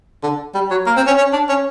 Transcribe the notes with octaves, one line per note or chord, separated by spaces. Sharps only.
D3
G3
F#3
A#3
C4
C#4
C#4
D4
C#4